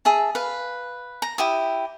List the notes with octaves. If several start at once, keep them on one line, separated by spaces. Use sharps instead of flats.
G#4 E5 A5
B4 F5
A#5
E4 G4 E5 D#6